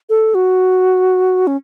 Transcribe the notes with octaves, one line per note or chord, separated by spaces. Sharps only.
A4
F#4
C#4